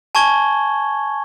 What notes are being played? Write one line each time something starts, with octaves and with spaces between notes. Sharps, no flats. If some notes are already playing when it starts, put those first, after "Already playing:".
G#5 A5 C#6 G#6 G7